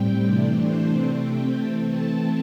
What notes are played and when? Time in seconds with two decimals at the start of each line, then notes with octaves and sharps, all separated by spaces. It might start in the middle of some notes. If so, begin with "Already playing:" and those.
Already playing: A2 G3 C4 G5
0.25 C3 E3 A3 D4 D5
0.59 C5
0.90 C3 A3 C4 D5
1.23 G5
1.55 E3 A3 C4 A5
1.89 A5